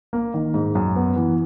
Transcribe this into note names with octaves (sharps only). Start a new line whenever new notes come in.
A#3
D#3
G#2
F#2
B3
E3